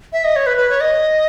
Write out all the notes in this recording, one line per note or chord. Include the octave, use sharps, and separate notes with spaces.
E5
D#5
C#5
B4
B4
C#5
D#5